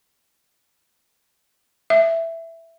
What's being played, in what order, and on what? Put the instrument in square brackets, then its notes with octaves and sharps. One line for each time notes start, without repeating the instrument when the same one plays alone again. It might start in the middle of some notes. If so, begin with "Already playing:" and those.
[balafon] E5